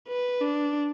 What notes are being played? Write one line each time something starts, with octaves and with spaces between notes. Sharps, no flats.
B4
D4